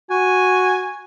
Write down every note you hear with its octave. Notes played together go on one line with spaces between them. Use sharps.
F#4 G#5